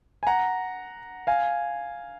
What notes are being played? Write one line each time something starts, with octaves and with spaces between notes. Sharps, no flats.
G#5
F#5 A#5
F5 G#5